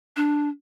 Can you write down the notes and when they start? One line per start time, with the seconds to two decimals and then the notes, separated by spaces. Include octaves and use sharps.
0.16 D4